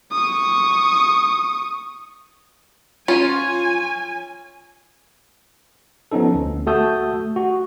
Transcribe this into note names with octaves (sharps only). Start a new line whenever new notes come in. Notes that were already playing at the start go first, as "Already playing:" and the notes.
C#6 D#6
C#4 F4 G#5
F3 B3 C#4 D#4 A4
D2
A3 F#4 A5 D#6 E6 G6
F#4